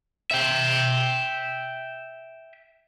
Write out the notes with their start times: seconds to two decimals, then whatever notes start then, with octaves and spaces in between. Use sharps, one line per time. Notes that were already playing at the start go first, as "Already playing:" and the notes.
0.31 E5 G5